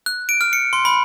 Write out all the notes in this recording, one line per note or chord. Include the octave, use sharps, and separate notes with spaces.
F#6
D7
F6
C#7
C6
B5